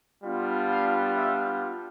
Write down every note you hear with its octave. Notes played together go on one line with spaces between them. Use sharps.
G3 B3 D4 F4
F5
E5